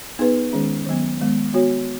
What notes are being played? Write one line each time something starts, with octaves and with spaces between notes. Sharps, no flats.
B3 D#4 G#4 B4
D#3 G#3 C#4 G#4
D#3 F#3 B3
D#3 G#3 B3
B3 F#4 C#5